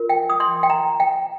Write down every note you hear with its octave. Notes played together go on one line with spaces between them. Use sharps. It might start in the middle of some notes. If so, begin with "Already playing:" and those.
Already playing: F4 A#4
G5
D#6
C6
G5
A#5
G5